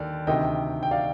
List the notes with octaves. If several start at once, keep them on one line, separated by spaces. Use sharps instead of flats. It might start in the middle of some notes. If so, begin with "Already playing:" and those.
Already playing: D#2 D3 D5
D2 C3 D#3 D#5 G5
G5
D5 F5